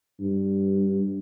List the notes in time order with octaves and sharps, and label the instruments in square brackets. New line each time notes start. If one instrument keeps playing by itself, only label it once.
[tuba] G2